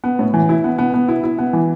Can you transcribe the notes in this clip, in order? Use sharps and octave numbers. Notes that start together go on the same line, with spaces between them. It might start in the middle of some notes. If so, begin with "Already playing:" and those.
B3
A2
E3
E4
B3
B3
B3
E4
E4
B3
E3